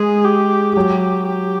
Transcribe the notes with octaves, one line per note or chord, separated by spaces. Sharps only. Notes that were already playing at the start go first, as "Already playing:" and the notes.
Already playing: G#3 G#4
G4
F#3 G4
G4